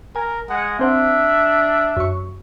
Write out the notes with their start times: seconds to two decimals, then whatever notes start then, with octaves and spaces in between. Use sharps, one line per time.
0.16 A#4 G#5
0.49 G#3 F#5
0.79 C4 D4 C5 E5 F#5
1.97 F#2 C#6